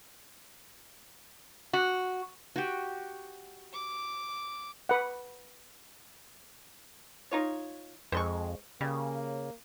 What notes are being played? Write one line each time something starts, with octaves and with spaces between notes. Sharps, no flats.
F#4
F#4 G4
D6
B4 F#5
D#4 F4 C#5
F2 G#3 C5 C6 C#6
C#3 G3 A#3